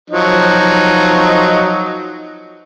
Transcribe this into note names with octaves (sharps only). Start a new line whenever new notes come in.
F3 F#3 D#4